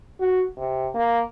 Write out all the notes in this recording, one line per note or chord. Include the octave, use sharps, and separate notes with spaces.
F#4
C3
A#3